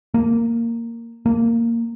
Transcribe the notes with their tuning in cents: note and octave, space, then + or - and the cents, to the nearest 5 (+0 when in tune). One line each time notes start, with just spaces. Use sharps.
A#3 -10
A#3 -15